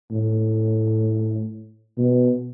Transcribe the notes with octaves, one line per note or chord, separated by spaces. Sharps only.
A2
B2